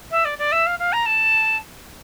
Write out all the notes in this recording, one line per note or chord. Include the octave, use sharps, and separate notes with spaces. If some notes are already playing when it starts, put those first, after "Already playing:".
E5
D5
D5
E5
F5
F5
A#5
A5